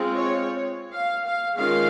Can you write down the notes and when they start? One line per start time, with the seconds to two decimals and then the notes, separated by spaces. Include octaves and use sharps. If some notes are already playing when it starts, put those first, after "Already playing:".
Already playing: G#3 C4 F4
0.14 C#5
0.94 F5
1.24 F5
1.56 D#3 G#3 C#4 F4 F5